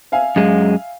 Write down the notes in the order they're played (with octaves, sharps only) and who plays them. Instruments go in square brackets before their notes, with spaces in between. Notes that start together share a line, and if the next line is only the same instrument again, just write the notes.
[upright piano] E5 F5 G#5
[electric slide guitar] F#2 G#3